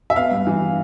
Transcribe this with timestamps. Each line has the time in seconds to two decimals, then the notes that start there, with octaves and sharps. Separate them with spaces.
0.10 E5
0.16 B3 F5
0.31 G2
0.47 E3